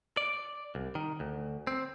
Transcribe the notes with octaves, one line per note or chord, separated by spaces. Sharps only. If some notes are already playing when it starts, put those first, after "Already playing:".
D5
C2
D#3
D2
C4